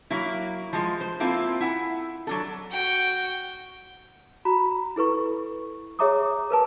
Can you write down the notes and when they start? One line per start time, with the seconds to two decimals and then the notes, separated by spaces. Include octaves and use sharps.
0.10 F#3 A#3 E4
0.73 F3 G#3
1.01 C5
1.20 A#3 C4 E4 F4 A4
1.61 E4 F#5 G#5
2.27 F#3 D4 A4
2.71 F#4 G5
4.45 F#4 A#5 B5
4.96 E4 A4 B4 C#6
5.99 G#4 C#5 E5 A#5 D6 D#6
6.50 A#4 B4 A5